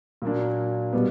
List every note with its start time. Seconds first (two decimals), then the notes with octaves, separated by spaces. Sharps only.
0.22 A#2 F#3 A#3 D4
0.93 B2 G3 B3